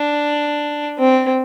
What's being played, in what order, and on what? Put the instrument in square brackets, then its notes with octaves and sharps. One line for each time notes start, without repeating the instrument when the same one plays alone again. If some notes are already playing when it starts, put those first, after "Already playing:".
Already playing: [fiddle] D4
C4